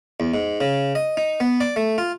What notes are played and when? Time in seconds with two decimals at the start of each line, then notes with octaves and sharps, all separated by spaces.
0.20 E2
0.34 G#2
0.60 C#3
0.95 D#5
1.17 D#4
1.40 B3
1.60 D5
1.76 A3
1.98 F4